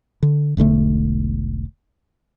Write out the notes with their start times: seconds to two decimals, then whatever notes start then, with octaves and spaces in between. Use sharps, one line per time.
0.23 D3
0.57 E1 B1 D3 A3